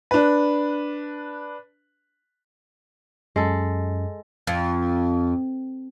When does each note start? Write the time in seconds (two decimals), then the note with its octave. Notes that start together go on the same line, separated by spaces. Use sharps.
0.11 D4 B4
3.36 F#2 G#3 A4
4.47 F2